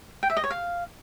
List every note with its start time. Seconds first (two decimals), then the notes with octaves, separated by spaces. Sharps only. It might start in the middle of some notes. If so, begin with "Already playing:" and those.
0.23 G5
0.30 E5
0.37 D#5
0.44 C#5
0.51 F5